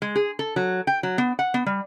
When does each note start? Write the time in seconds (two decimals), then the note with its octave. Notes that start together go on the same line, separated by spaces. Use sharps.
0.02 G#3
0.16 G#4
0.39 A4
0.56 F#3
0.87 G5
1.03 F#3
1.18 B3
1.39 F#5
1.54 B3
1.66 G3